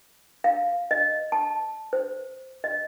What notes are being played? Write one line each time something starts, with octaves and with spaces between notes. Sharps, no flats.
F5
D#5
A5
C5
D#5